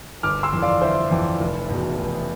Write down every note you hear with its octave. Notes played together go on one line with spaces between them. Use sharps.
G1 D6 F6
C6 E6
F2 E3
D5 F5
G1 C5 E5
F2 E3
F1
E2 B2
F1